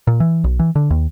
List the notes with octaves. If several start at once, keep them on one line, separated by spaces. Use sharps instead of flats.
A#2
E3
B1
E3
D3
D#2